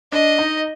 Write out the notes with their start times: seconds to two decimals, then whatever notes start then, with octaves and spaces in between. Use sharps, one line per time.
0.12 D4 D#5
0.39 D#4